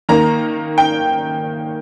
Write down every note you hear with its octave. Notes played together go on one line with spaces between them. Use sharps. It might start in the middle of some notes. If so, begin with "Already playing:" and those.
D#3 A#3 A#5
G5